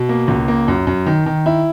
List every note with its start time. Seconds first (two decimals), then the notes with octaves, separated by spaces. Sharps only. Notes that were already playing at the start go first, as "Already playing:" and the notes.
Already playing: B2
0.09 A#3
0.28 C#2
0.48 A#3
0.68 F#2
0.87 F#2
1.06 D#3
1.26 D#3
1.46 E4